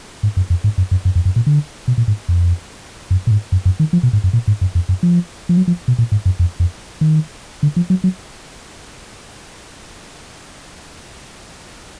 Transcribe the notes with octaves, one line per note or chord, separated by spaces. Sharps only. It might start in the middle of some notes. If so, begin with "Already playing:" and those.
G#2
F#2
F2
G#2
F#2
F#2
F#2
F2
F#2
A#2
D3
B2
A#2
G#2
F2
F#2
A#2
G#2
F#2
F#2
D#3
F3
B2
G#2
F#2
A#2
G#2
F#2
F2
F#2
F3
F3
F#3
F3
B2
A#2
G#2
F#2
F2
F2
D#3
D3
F3
F#3
F#3